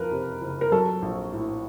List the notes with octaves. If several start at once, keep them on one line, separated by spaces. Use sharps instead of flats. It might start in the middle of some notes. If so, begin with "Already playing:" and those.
Already playing: F#1 F2 F3 A#4 B4
C3
F#1
A#4
F#3 A4
A#1
A2